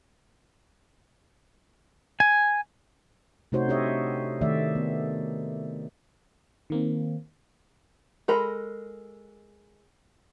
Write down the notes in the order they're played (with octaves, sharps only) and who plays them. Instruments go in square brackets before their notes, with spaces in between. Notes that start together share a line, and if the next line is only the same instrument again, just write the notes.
[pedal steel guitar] G#5
[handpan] C3 A3 D#4 F#4 C5 C#5
D4 G4 C#5 D#5 E5
D#3 A3 D5 E5
B3
[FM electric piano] D#3 A#3 C4
[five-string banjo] G#3 A4 A#4 B5